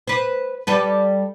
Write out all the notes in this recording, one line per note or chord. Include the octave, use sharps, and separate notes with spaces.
B4 C5
G3 A4 B4